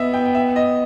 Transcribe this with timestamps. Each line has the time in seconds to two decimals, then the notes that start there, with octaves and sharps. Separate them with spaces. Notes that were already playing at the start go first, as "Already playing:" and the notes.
Already playing: B3 D#5 E5
0.13 G5
0.25 G5
0.35 E5
0.56 D#5